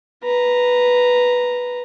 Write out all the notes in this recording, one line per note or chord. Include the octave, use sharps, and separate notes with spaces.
B4 A#5